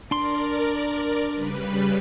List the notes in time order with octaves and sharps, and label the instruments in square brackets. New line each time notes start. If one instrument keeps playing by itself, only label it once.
[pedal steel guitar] D4 C6 [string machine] A#4 D5
[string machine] C#3 G3 B4